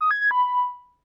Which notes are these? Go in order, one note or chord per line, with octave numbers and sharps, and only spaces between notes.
D#6
G#6
G#6
B5